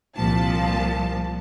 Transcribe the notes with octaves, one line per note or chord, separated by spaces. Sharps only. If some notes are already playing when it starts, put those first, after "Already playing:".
C2 A#2 F3 A5